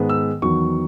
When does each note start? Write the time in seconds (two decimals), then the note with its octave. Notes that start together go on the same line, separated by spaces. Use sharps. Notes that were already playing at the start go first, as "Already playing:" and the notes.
Already playing: G#2 D#3 G#3 B3
0.09 E6
0.42 E2 D#3 F#3 B3 C#6